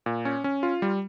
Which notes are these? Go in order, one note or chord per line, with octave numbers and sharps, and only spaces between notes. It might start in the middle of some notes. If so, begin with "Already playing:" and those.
A#2
C#4
C#4
F4
G3